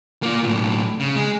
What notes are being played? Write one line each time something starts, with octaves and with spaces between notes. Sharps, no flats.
A#3 F4
B1 A2
C#3
G#3